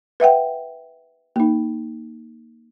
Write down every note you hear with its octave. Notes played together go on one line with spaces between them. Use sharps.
B4 E5 F#5 G5
A#3 D#4